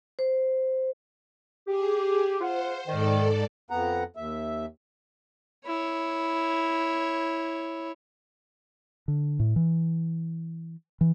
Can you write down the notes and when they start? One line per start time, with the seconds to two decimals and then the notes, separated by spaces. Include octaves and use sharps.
0.19 C5
1.67 G4 G#4
2.41 F4 C5 F#5
2.87 G#2 D#3 A4 D5
3.70 F2 B3 F#5 A#5
4.16 D#2 E5
5.67 E4 C#5
9.08 D3
9.40 A2
9.56 E3
11.01 E3